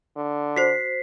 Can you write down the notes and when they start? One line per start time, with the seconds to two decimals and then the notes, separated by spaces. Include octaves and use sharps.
0.16 D3
0.56 F#4 C5 B6 C7